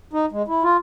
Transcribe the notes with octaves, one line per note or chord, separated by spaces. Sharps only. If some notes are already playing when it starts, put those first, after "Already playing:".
D#4
G#3
E4
F4